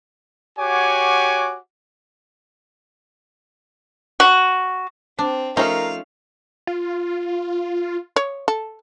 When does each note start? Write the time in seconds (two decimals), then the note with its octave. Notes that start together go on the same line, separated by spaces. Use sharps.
0.58 F#4 G4 C#5 F#5 G#5 D6
4.20 F#4
5.19 C4 D4
5.57 F3 A3 C#4 D#4 A#4 F5
6.67 F4
8.16 C#5
8.48 A4